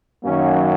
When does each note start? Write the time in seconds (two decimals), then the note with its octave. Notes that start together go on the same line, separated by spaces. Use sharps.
0.23 F#2 D#3 F#3 A#3 C#4